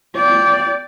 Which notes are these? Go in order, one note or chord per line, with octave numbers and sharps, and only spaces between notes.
D5 G5